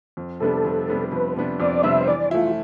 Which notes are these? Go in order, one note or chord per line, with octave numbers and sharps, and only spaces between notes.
F2
C3 G3 B3 D4 A4
F2
C3 G3 B3 D4
F2 B4
C3 G3 B3 D4
F2 D5
C3 G3 B3 D4 E5
C5
E3 D5
A3 E4 F4